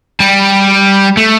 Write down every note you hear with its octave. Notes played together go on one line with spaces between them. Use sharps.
G3
A3